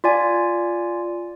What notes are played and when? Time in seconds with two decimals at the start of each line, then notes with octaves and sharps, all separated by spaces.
0.04 F4 D5 G#5